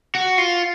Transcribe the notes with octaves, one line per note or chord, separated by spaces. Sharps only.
F#4
F4